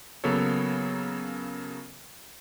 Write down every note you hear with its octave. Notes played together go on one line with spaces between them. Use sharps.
C#3 F#3 A#3 B3 A4 C#5